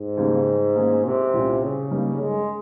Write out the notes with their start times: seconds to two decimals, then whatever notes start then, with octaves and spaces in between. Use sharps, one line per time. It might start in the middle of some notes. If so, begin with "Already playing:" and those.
Already playing: G#2
0.17 D#2 C#3 G3 A#3
0.76 D#3 A#3 C#4 G#4
1.04 C3
1.33 C2 A#2 G3 C#4
1.62 C#3
1.91 G2 G3 A#3 D#4
2.20 G#3